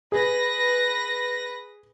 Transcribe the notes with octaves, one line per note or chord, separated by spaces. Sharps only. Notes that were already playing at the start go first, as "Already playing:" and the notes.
G#4 B4 A#6